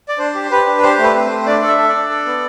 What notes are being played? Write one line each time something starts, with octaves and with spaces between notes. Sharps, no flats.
D5
D4 C5
G4
G4 B4
D4
G4 C5
A3
B4
C4
C5
A3
D4 D5
A4
E5
A4
D4 D5
A4
B3